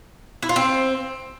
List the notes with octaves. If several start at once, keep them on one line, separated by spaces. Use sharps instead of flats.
E4
F4
C4